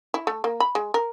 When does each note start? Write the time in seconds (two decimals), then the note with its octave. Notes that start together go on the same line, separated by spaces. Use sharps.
0.14 E4
0.27 A3
0.44 A#3
0.60 B5
0.75 G#3
0.94 A#4